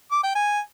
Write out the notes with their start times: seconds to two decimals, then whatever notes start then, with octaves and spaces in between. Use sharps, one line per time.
0.11 D6
0.23 G5
0.35 G#5